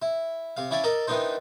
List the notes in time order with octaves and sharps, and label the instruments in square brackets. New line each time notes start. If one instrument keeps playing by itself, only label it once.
[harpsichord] E4
C3 F5
C#4 E4 D5 F5 G#5
A4 A#4 D5 D#5
D#3 E3 B3 D4 D#4 C5